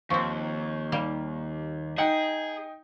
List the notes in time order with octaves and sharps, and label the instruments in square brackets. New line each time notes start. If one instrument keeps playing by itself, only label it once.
[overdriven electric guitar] D#2 [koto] F3 C4 [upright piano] C#6
[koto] G3 A#3
[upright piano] D#4 G5 [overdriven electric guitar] G#4 [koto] F#5